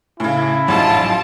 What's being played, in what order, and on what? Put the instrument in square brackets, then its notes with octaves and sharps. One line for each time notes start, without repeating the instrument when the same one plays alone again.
[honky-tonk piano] A2 C#3 [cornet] E4
[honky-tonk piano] A1 G#2 G#3 [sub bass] F#3 [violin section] F4 A5